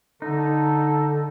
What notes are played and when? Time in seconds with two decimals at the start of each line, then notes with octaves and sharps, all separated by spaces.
0.22 D3 D#4 A4